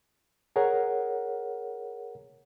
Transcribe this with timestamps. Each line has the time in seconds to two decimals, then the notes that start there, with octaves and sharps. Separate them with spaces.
0.56 G#4 A#4 C#5 F#5